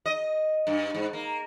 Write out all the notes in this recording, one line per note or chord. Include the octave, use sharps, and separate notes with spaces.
D#5
G2
G#2
A#3